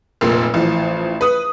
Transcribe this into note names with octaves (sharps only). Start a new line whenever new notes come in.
F1 A#2
A1 E3 F3
B4 D#6